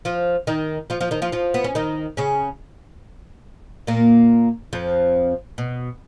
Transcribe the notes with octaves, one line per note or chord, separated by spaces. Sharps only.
F3 F4
D#3 D#4
F3 F4
F3 F4
D#3 D#4
F3 F4
F3 F4
B3
C#4
D#3 D#4
C#3 C#4
A#2 A#3
F2 F3
B2